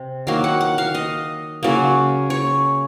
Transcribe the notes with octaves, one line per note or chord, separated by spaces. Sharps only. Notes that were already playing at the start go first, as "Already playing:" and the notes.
Already playing: C3
D#3 F#3 A#3 F5
F#5
F#5
F5
D#5
C#3 F#3 A#3
C#5